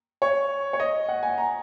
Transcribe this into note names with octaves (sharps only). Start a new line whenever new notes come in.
C#5
C#5
D#5
F#5
G#5
A#5